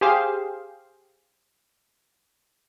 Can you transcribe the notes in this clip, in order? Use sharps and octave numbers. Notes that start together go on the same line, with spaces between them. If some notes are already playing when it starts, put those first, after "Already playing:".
G4 G#4 C5 F5